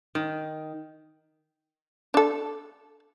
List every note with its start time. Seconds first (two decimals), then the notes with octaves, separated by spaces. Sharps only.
0.15 D#3
2.14 D4 A4